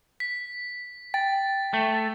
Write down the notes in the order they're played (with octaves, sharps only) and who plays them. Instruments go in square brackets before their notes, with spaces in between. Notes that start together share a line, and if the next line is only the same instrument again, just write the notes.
[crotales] B6
[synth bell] G5 [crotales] A6
[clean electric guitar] A3